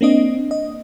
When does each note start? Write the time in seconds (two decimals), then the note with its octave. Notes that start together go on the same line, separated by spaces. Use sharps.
0.01 A#3 C4 D4 D#5
0.51 D#5